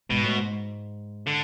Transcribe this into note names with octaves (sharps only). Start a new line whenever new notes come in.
G#2 B2
A2
G#2
D3